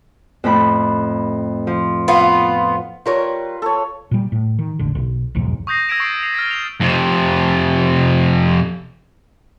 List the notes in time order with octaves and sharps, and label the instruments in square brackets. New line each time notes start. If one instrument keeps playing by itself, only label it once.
[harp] F2 A2 B5
F3
[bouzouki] B3 F4
[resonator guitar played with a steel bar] G3 A#4 C#5 [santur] F4 B4
[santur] A4 C#5
[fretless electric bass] A#2 G3
A2
D#3
E1 A1 D3
B1
F1 B1 E2 G#2
[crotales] C#6 D#6 G6 A#6 C7
E6 G#6 A#6 B6 D7 E7
C#6 A6 C7 D7
C7 F7
F6 G#6 A6 B6
F7
[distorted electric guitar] F2 C3